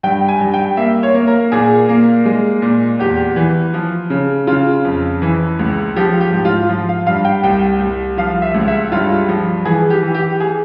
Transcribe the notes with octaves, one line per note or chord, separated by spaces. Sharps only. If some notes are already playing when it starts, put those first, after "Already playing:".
G2 G5
G#5
G2
G5
A#3 E5
C#5
A#3
A#4
A#2 G#4
A#3
G#3
A#2
E2 G4
E3
F3
C#3
C#3 F4
F2
E3
C#2
F3 G4
G4
G#2
F4
F3
F5
G2 F5
G5
C2 G5
C2
F3 F5
E5
C#2
E5
G2 F4
F3
E3 G#4
G4
E3
G4
G#4